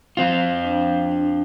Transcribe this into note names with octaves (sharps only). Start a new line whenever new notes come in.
F3 C4 F4
D4
D4